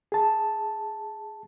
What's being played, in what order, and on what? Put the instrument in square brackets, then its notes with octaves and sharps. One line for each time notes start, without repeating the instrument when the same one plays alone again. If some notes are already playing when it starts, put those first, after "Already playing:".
[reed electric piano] G#4 A5